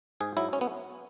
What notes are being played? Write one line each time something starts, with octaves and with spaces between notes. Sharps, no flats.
G#2 G#4
F#3 E4
C#4
B3